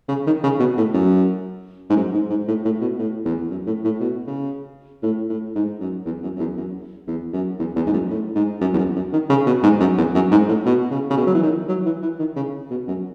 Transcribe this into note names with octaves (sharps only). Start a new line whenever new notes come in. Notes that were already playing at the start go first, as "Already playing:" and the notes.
C#3
D#3
C#3
B2
A2
F#2
G#2
F#2
G#2
G#2
A2
A2
B2
A2
E2
F#2
A2
A2
B2
C#3
A2
A2
G#2
F#2
E2
F#2
F#2
E2
F#2
E2
F#2
E2
E2
G#2
F#2
A2
G#2
F#2
E2
F#2
F#2
D#3
C#3
B2
G#2
F#2
E2
F#2
G#2
A2
B2
C#3
C#3
B2
F#3
E3
D#3
F#3
E3
E3
D#3
C#3
B2
F#2